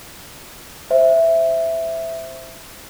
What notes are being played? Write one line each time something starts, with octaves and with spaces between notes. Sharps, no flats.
C5 E5